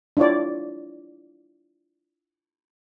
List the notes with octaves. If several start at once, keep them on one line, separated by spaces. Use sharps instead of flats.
D4 E4 F4 C#5 D5